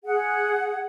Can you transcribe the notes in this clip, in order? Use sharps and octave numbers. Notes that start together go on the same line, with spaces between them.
G#4 F#5